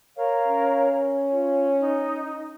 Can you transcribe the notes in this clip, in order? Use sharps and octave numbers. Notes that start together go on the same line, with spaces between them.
A#4 C#5 F5
C#4
F4
D#4